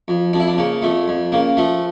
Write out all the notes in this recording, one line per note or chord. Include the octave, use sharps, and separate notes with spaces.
F2
F2 D4
E4
D4
C#3 A#3
F2 A3
F2
C#3 A#3
F3 A3